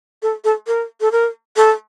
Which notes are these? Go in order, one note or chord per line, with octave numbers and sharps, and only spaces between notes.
A4
A4
A#4
A4
A#4
A4